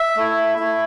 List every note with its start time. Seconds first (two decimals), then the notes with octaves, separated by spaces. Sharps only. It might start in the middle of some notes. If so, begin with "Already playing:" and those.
Already playing: E5
0.16 A3 E4
0.58 A3 E4